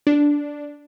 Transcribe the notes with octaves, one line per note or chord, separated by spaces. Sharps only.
D4